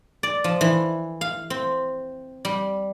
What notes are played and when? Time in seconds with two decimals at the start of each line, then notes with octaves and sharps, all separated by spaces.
0.23 D5
0.44 F3
0.61 E3
1.21 F5
1.50 C4
2.45 G3